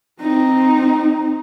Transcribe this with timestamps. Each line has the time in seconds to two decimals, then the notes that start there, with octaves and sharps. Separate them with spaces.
0.21 C4 D#4